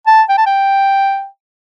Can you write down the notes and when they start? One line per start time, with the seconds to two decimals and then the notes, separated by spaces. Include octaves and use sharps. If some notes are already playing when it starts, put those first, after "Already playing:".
0.07 A5
0.29 G5
0.38 A5
0.46 G5